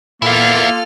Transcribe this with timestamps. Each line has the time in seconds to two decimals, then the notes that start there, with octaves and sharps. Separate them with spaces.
0.22 A#2 A#3 B3 E4 F4 A4 F6